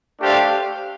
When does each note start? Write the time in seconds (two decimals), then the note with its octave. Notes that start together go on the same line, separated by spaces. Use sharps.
0.19 A3 D4 G4 C5 F5